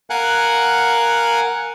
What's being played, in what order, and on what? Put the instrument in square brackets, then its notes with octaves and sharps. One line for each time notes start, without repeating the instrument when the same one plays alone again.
[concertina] A#4 F5 F#5 G#5 F#6